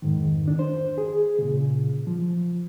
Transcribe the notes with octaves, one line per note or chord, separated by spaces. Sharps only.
F2 G#2 D#3
D#3 D4
C5
G#4
A#2 C#3
F3